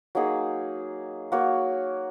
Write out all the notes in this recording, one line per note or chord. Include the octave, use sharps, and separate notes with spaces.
F#3 A#3 D#4 G#4
A#3 F#4 C#5